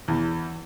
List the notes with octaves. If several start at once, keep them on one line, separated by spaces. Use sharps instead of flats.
E2